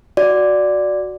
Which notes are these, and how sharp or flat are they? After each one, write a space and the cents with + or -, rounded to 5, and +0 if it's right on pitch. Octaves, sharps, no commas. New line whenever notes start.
F#4 -5 D5 +0